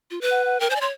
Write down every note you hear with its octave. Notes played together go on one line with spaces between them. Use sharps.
F4
B4
F#5
F#5
A#4 G5
C5 G#5
D5
C#5 C6